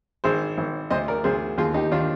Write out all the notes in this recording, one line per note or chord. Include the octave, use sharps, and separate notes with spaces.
G#1 G#4 C5
G#1
D2 C5 D#5
A#4 D5
D2 G#4 C5
D#2 F4 G#4
D#4 G4
D#3 D4 F4